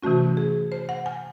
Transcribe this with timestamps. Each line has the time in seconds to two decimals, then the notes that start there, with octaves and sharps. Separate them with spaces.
0.02 C3 E3 A3 C#4 F#4
0.37 G#4
0.72 C5
0.89 F#5
1.06 G#5